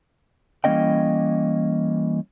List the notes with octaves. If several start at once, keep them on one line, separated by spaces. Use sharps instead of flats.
E3 G3 A#3 C#4 D#5 G5